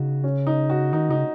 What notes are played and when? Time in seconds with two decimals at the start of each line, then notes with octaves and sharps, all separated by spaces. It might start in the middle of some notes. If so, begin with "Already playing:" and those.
Already playing: C#3 D#4 F#4
0.24 C#4
0.47 D#4
0.70 F#4
0.93 D#3 D#4
1.09 C#3 D#4